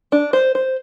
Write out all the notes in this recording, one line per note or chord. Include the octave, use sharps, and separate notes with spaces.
D4
C5
C5